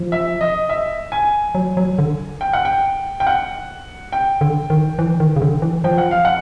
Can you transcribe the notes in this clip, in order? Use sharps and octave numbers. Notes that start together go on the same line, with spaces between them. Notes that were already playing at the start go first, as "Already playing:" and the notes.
Already playing: F3
E5
D#5
E5
G#5
F#3
F#3
D3
G5
F#5
G5
G5
F#5
G5
D3
D#3
E3
D#3
C#3
D3
E3
F3 G5
F#5
F5
F#5